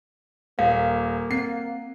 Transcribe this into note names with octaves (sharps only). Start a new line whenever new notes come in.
D#1 A#3 F5
C4 C7